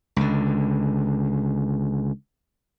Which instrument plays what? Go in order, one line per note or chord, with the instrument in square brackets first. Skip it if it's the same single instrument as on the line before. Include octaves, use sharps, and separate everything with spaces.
[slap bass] C#2 D3